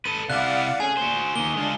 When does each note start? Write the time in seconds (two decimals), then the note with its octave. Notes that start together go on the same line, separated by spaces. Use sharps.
0.06 A4 B4 D#7
0.30 C3 E4 D5 F5 F#5 F#6
0.80 A3 C#4 G#4 G#5
0.97 A#2 F#4 C5
1.35 D#3 F3 A#3 G7
1.56 G#3 D4 F4